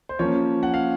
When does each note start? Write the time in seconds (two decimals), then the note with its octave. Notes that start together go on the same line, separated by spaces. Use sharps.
0.09 C5
0.19 F3 A#3 C#4 C#5
0.63 F#5
0.74 F5